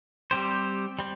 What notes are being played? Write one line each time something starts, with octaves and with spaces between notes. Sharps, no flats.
G3 C4 G4 C5
G3 C4